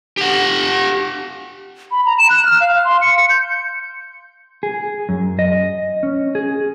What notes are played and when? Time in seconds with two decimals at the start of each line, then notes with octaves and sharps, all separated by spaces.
0.17 G4 F#5
1.91 B5
2.06 A#5
2.19 E7
2.30 F#6
2.45 F6
2.60 F5
2.85 C6
3.01 C#7
3.17 C#7
3.30 G6
4.63 G#4
5.09 F#2
5.39 D#5
6.03 C#4
6.35 G#4